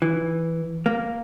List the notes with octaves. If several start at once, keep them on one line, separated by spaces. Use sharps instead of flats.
E3
A#3